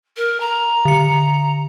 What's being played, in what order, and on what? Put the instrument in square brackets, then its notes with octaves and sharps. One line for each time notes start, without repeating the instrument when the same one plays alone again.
[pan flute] A#4
A#5
[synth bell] D3 C#7